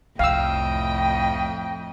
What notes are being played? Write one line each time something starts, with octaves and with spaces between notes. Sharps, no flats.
C2 F2 A2 D#5 F5 G5 E6